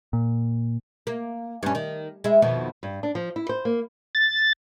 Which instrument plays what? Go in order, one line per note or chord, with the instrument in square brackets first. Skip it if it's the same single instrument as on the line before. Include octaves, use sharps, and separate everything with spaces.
[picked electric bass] A#2
[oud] A#3
G2 C#4
D#3
G#3 E4
F2 B2 D#3
[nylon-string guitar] G2
D4
F3
E4
C5
A#3
[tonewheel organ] A6